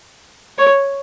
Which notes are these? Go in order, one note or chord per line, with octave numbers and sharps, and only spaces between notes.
C#5